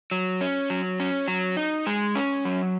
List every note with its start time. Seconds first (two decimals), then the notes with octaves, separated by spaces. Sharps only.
0.11 F#3
0.41 C#4
0.70 F#3
1.00 C#4
1.28 F#3
1.57 D#4
1.87 G#3
2.15 C#4
2.45 F#3